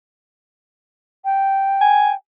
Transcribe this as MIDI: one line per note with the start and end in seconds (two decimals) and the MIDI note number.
1.25 2.15 79
1.81 2.11 80